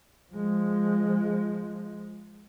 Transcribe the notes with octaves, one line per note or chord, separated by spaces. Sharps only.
F3 G#3